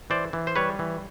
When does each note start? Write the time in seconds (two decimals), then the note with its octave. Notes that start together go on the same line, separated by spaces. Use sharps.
0.10 E3 C5 D5
0.33 E3
0.47 C5
0.56 G3 B4 C#5
0.79 E3